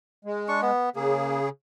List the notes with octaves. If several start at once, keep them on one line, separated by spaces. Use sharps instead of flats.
G#3
D4 C#6
B3
C#3 A#3 G#4